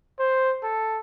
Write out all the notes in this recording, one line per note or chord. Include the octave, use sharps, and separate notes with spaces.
C5
A4